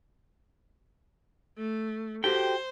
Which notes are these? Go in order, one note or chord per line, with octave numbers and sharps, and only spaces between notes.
A3
F#4 G4 A4 C5 G5